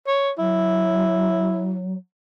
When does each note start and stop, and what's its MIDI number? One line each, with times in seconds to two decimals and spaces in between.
0.07 0.31 73
0.38 1.94 54
0.38 1.83 64